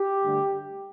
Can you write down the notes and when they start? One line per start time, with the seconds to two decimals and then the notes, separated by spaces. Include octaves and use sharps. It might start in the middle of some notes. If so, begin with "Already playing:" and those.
Already playing: G4
0.23 G2 D3 A3